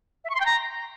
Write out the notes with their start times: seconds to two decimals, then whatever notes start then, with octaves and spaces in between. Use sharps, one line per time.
0.24 E5
0.30 C#6
0.35 C6
0.40 G5
0.46 A#5